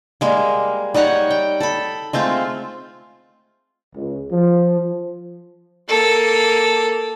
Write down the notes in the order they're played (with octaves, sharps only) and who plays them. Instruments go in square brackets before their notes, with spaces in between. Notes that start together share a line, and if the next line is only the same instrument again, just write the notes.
[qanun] G3 G#3 A#3
G3 D#4 C#5 F#5
G5
A4 B5
G#3 A3 C4 F4
[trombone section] C#2
F3
[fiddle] A#3 A4